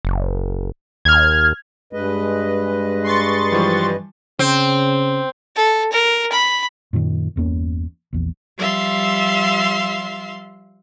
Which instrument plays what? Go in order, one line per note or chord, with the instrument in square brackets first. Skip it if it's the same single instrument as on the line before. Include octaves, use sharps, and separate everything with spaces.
[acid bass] F#1
[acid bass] D#2 [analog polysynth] F6 G#6
[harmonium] G2 B4 D#5 [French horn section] G#3
[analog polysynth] C6 C#6 A6
[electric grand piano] E3 F3 G3
[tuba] C#3 [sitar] C4
[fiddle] A4
A#4
B5
[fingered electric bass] F#2 A#2 D3 D#3
G1 E2 A#3 C#4
A#1 E2
[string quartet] F3 G3 E5 F5 C6